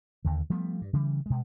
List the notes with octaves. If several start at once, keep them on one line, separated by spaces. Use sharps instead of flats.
D#2 D3
F3 G3 A3 B3
G2
C#3 E3 G3
B2 G#3